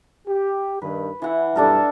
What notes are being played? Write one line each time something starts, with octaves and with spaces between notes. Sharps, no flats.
G4
G2 D#3 B4
E3 E4 F#5
B1 G2 G3 D4 A4 A#4